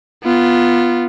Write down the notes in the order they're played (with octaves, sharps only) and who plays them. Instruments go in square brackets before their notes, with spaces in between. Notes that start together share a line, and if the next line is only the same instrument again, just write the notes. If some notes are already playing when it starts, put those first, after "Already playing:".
[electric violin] B3 F4